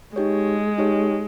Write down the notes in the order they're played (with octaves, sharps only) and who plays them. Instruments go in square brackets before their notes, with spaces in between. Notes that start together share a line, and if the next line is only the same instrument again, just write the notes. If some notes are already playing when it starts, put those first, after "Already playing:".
[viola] G#3 [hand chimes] D#4 G4 C#5
[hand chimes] D#4 G4 C#5